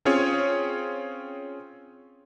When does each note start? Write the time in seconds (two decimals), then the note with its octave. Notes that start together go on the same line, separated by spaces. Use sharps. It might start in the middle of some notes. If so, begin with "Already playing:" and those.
0.05 C4 C#4 F4 G#4 C#5